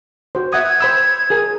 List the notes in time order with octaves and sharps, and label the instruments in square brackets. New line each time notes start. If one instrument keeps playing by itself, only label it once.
[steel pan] F#4 C5
[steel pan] E5 F#5 D#6 [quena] G#6
[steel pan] C5 B5 E6
G#4 A#4 G#5